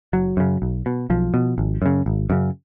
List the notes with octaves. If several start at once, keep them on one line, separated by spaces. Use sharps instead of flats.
F#1 F#3
F#2 C#3
B1
B2
B1 F3
B2
G#1
F#2 C#3
G#1
F#2 C#3